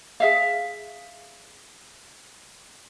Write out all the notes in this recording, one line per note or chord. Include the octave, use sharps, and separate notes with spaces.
G#4 E5 F5